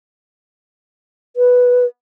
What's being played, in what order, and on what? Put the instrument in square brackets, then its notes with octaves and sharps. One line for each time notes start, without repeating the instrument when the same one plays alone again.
[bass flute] B4